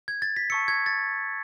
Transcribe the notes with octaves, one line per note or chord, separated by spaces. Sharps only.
G#6
A6
B6
A5 C#6 E6 C#7
G#6
A6